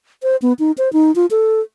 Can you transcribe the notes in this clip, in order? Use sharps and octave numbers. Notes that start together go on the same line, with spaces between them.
C5
B3
D#4
C5
D#4
F4
A4